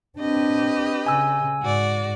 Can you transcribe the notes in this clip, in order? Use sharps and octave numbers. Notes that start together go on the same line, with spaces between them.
C4 D4 G4 B4 D#5
C#3 G#5 E6
G#2 F#4 D5